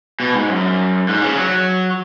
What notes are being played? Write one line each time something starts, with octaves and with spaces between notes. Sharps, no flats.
B2
G#2
F#2
G#2
C#3
F#3